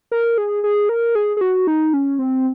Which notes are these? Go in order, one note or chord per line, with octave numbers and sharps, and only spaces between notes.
A#4
G#4
G#4
A#4
G#4
G#4
F#4
D#4
C#4
C4